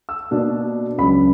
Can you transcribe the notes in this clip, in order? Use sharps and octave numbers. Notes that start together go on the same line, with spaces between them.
E6
B2 A#3 D4
C#2 C#3 F#3 B5